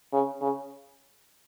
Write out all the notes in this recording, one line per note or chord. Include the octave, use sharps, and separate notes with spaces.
C#3
C#3